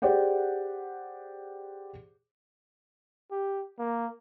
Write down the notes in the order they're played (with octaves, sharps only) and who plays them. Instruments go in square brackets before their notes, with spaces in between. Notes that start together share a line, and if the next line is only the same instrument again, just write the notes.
[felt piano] G4 G#4 C5 D5 F#5 G5
[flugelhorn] G4
A#3